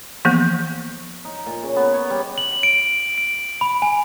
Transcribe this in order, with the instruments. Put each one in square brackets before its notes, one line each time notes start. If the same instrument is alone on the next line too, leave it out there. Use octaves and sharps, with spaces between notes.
[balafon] E3 F3 A#3 B3
[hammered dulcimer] D#4
A#2
C#3
B3
C#5
G3
[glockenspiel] F#7
D7
D7
B5
G#5